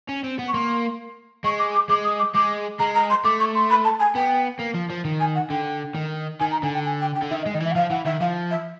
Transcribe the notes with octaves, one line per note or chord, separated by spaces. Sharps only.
C#4
C4
B3
C#6
A#3 C6
G#3 C#6
D6
D6
G#3 D6
D#6
D6
G#3 D6
G#3 A#5
A#5
C6
A3 D6
C#6
C6
B5
A5
G#5
B3 G5
A#3
F3
F3
D#3
G#5
F#5
D3 G5
D#3
D#3 G#5
A#5
D3 G#5
G5
G#5
G5
G5
D3
D#3 E5
D#5
G#3
D#3 D#5
E3 E5
F#5
F3 F5
E3 F#5
D#3 E5
F3 F5
E5